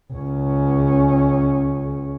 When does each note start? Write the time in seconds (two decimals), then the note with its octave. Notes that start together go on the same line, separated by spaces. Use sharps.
0.13 C#2 C#4